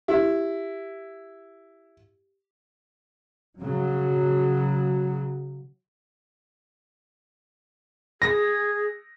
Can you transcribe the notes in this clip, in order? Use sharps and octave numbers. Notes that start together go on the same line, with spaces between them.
E4 G4
C#3 F#3
G#4 A#6